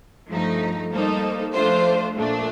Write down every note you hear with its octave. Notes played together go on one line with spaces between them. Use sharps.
G2 F3 A3 D#4
G3 A#3 D#4 A4 C5
F3 A3 D4 F4 C5
A#2 A3 D4